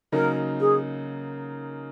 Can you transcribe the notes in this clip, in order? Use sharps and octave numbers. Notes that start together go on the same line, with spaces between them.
C#3 F#3 A#3 D#4 A#4
G#4